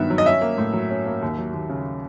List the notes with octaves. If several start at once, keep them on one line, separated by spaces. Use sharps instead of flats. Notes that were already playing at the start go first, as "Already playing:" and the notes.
Already playing: G2 D#3 F#3 B3 E5
F#3
D#5
C#4 E5
A#3
A2
F#3
C#4
A#3
D#2
F#3
D#2
C#3